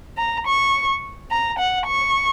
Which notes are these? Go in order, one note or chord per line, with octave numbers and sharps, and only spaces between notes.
A#5
C#6
A#5
F#5
C#6